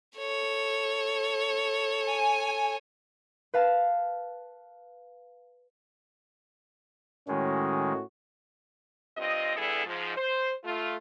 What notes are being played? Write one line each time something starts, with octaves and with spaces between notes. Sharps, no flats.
A4 C#5
G#5
B4 F5 A5
A2 D#3 G#3 C#4 F#4
G2 C4 F4 D#5
D3 G3 B3 E4 G#4 A4
G#2 F3
C5
A3 F4